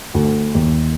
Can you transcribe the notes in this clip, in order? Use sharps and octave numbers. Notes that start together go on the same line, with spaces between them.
D2
D#2